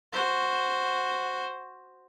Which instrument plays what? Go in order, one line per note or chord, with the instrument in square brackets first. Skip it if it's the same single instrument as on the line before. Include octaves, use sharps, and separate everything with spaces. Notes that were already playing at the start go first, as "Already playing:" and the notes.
[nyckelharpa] F#4 C5